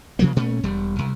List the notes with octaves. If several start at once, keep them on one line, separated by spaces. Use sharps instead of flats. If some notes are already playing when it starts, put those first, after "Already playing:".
C3 F3 F#3 A#3
A#2 A3 C#4
E1 G3
C2